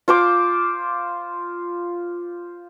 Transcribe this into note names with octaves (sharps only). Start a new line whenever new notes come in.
F4 C5 D6